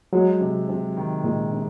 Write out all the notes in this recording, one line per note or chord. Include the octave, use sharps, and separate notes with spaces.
F#3 G#3
C3
C3
D#3
A#2 G#3
C3